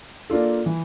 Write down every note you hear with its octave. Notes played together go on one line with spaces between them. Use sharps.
A#3 D4 F4 A4
E3